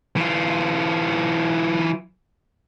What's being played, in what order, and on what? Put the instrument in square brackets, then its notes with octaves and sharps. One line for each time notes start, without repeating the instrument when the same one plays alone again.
[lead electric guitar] E3 F4